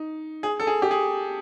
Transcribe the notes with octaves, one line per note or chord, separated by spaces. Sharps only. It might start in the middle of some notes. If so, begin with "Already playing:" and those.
Already playing: D#4
G#4
A4
G#4
G4
G#4